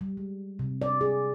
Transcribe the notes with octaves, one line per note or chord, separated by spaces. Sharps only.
G3
G#3
C3
D5
G#4